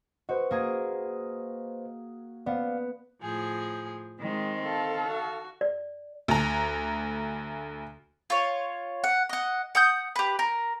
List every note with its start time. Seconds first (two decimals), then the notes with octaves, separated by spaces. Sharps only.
0.29 F#4 B4 C5 D#5
0.51 A#3 G#4
2.46 B3 D5 F5
3.22 A2 F3 G#4
4.20 D#3 G#3 C4
4.65 A4 F5
5.07 F#4
5.61 D5
6.28 D2 A#5
8.30 F4 C#5
9.04 F#5
9.29 D#5 F#5
9.75 F#5 D#6 G6
10.16 G4 B4
10.39 A#4